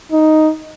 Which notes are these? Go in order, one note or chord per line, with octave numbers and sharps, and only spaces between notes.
D#4